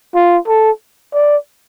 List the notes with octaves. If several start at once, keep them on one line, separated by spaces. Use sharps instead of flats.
F4
A4
D5